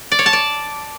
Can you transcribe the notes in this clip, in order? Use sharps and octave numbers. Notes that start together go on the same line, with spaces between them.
D5
C#5
A5
D5